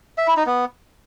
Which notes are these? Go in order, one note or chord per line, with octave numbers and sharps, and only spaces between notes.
E5
E4
D#4
B3